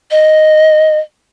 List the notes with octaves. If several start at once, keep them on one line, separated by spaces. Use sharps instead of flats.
D#5